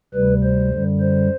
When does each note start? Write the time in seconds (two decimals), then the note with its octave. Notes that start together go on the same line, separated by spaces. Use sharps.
0.14 D2 C3 G3 B4
0.43 C5
0.72 F#2 D3 G3
1.01 C5